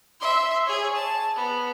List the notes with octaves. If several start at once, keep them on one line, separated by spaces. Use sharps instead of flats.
E5 C6
G#4 C#5
A5
B3